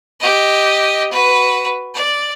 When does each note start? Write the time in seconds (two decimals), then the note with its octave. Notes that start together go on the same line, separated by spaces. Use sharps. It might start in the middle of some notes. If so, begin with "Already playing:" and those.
0.20 G4 D#5
1.11 F#4 B4
1.95 D5